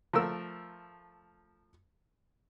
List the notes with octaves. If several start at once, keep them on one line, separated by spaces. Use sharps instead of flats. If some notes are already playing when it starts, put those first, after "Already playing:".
F3 A3 A#4 E6